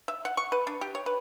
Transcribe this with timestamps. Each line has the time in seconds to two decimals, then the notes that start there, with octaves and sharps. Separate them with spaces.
0.08 E5
0.25 F#5
0.37 C#6
0.52 B4
0.67 D4
0.81 G4
0.95 C#5
1.06 B4